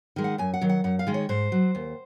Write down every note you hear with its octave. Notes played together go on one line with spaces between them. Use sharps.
D#3 G#3
F#5
F#2 G#5
F#5
D#3 F#3
F#5
F#2 F#5
F5
D#3 G#3
C#5
G#2 C5
F#3
D#2